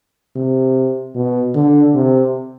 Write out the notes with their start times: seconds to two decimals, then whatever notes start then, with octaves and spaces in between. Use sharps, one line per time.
0.36 C3
1.15 B2
1.55 D3
1.95 C3